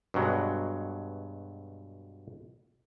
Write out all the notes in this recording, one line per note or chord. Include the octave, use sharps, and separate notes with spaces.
G2 B2 F#3 G#3